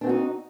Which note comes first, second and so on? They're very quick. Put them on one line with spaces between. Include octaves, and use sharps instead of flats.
D4 C4 F#4 D#4